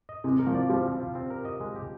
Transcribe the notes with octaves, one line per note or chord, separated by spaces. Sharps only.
D#5
C3 G#3
A#4
F3
D5
F3 G3
C4
F4
C4
A#4
D#5
G#3
G4